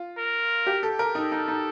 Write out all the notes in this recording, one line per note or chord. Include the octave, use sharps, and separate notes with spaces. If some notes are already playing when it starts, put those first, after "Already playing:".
Already playing: F4
A#4
G4
A4
A#4
D#4 A4
D#4
D#4